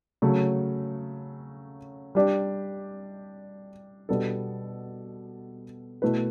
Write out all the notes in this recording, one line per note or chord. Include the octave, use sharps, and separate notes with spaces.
C#3 F#3 A3
G3 D4 G4
B2 G3 B3 D4 A4
B2 A3 E4 B4